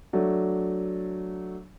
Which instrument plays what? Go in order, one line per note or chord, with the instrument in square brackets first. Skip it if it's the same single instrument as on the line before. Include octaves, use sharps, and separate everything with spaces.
[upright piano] F#3 A3 D4